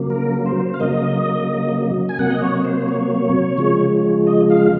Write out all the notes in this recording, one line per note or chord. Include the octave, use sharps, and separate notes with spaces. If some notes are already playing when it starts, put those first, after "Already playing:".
Already playing: C#3 F#3 A#3
A#4
C5
F5
C#3 F#3 A#3 D#5
G#5
C3 F#3 A#3 F#5
D#5
C#5
C5
C#5
C#3 F3 G#3
D#5
F5